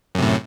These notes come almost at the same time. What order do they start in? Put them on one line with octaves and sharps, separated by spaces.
F#2 C3 A2